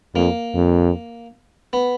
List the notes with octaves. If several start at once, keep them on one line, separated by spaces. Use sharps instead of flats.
F2 A#3
F2
B3